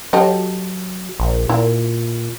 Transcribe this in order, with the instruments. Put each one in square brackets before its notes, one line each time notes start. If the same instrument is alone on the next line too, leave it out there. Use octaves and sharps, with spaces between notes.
[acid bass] F#3 [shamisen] G4 A4 D#5
[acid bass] A#1
[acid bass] A#2 [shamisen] E4